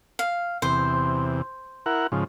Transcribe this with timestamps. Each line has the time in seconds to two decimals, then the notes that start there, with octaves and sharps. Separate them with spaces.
0.19 F5
0.62 E2 C3 C5
1.86 E4 A#4 F#5
2.12 G#2 C#3 F3